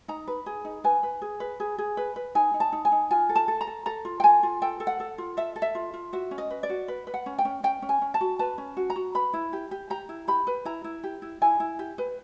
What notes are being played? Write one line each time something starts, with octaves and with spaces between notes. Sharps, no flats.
D#4 A#5
B4
G#4
D#4
B4 G#5
B4
G#4
B4
G#4
G#4
B4
B4
D#4 G#5
D#4
A5
D#4
G#5
D#4
F4 G#5
A4
A5
A4
A#5
A4
A4 A#5
F4
G5
A4 G#5
F4
A4 G5
A4
F#5
A4
F4
A4 E5
A4
E5
F4
F4
F#4 E5
C#4
D#5
B4
D5
F#4
B4
B4
F#5
C#4
G5
C#4
C#4 G5
C#4
G#5
C#4
A5
F#4
B4 A5
C#4
F#4
A#5
F#4
B4 B5
E4
G4
G4
G4 A#5
E4
G4 B5
B4
E4 A#5
E4
G4
E4
E4 G#5
E4
G4
B4